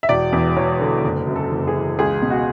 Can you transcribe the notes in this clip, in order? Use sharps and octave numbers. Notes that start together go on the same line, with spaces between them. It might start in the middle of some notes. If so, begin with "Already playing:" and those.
E5
E1 D5
E2
E1 C#5
D3
F#1
F#2
A4
F#1
G#4
E3
C#2 G#4
B2
F#4